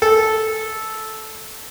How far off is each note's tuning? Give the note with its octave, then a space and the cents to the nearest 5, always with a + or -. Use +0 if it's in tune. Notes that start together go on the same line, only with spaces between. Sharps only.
A4 -10